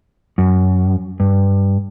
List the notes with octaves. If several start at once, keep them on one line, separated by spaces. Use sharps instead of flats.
F#2
G2